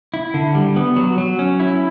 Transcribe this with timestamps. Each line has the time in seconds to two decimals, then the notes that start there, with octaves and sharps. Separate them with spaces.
0.14 E4
0.34 D3
0.55 G3
0.76 B3
0.97 F#3
1.18 F#3
1.39 C#4
1.60 E4